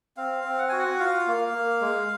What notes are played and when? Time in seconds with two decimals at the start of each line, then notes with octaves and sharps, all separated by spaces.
0.17 C4 F5
0.44 C4
0.58 F#5
0.69 F#4 G#5
0.79 F#5
0.99 F4 F5
1.27 A#3
1.54 A#3
1.81 G#3